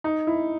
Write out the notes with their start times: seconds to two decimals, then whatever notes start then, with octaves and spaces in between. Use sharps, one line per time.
0.04 D#4
0.27 E4